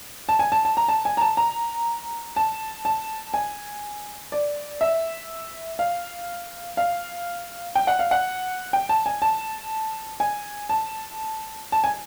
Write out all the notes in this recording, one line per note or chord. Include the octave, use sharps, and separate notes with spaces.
A5
G#5
A5
A5
A#5
A5
G#5
A#5
A5
A#5
A5
A5
G#5
D5
E5
F5
F5
G5
F#5
F5
F#5
G5
A5
G#5
A5
G#5
A5
A5
G#5